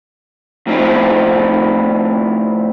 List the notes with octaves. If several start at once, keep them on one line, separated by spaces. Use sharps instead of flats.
A2 F3 C4 D#4 E4